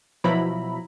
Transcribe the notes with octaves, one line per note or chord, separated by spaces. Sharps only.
B2 F3 F#3 E4 A#5 B5